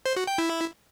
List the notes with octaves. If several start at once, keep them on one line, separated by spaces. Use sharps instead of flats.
C5
F#4
G5
E4